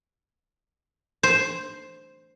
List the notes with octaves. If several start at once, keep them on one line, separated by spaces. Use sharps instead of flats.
C5